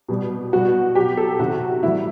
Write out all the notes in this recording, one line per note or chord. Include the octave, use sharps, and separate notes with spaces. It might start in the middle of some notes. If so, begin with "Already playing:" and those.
B2 G3
B2 G3 F#4
B2 F#3 G4
A4
C3 D#3 F#3 F#4
A2 E3 G3 E4